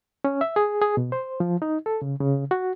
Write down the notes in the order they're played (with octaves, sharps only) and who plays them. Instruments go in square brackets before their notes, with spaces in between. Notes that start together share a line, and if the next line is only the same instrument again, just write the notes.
[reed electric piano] C#4
E5
G#4
G#4
B2
C5
F3
D#4
A4
C#3
C#3
F#4